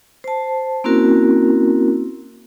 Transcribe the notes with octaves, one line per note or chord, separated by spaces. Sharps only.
C5 A5
A#3 C4 C#4 E4 F#4 A#4